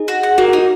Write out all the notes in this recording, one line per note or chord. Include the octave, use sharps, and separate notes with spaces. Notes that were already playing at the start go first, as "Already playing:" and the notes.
Already playing: D#4 G#4
F#4
F#5
A#3 F#4
F#4
D#4
F#4